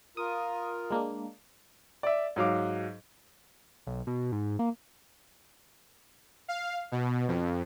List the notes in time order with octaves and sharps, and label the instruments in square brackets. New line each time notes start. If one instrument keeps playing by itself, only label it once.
[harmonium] F4 A#4 [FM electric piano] D#6
[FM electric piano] G#3 A#3 D4
[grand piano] D5 E5
G#2 F#3 F5 D6
[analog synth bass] B1
B2
G#2
A#3
[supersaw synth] F5
B2
F2